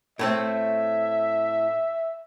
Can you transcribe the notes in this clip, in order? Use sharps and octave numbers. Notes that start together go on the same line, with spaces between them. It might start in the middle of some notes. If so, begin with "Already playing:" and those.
A2 A3 C4 E5